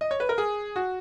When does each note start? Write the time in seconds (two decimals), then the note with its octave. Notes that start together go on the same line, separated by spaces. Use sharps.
0.01 D#5
0.11 C#5
0.20 B4
0.29 A#4
0.38 G#4
0.76 F#4